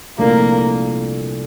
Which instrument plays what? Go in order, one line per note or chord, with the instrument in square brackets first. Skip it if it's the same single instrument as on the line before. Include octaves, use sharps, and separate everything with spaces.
[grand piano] C2 A#2 F3 A3 D4 [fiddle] A#3